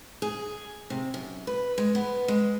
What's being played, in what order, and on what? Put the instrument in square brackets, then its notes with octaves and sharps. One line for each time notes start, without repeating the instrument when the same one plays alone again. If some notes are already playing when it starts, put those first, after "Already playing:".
[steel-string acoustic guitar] G#4
C3
F#2
B4
G#3
B3
G#3